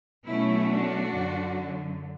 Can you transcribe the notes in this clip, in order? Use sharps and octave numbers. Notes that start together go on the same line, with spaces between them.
B2 F#3 A3 C#4 E4
D4 F#4
F#2 D3 F#3